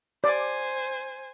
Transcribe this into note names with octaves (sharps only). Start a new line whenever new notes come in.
C5 D5 G#5